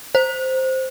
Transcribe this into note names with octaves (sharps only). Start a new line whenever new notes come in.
C5